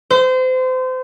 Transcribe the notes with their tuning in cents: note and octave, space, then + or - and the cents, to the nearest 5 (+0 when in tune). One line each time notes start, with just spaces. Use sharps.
C5 -30